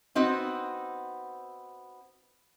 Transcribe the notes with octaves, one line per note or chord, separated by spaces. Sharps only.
B3 C4 D#4 F#4